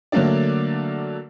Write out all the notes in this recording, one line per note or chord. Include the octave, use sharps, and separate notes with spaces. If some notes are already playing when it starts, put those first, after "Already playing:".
D3 F#3 A3 A#3 D4 D5